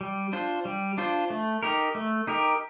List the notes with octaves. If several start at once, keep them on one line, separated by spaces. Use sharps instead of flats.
G3
D4 F4 C5
G3
D4 F4 C5
A3
D#4 G4 A#4
A3
D#4 G4 A#4